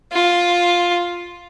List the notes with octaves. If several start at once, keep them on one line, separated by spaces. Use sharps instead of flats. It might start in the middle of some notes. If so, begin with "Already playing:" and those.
F4